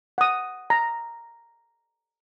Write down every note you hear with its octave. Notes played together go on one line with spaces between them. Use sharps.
F#5 D#6
A#5